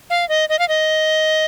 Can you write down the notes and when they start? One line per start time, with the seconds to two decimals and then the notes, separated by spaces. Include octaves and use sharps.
0.10 F5
0.29 D#5
0.49 D#5
0.59 F5
0.68 D#5